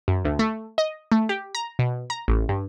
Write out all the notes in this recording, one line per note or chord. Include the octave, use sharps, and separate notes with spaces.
F#2
D2
A3
D#5
A3
G4
A#5
B2
A#5
A1
G2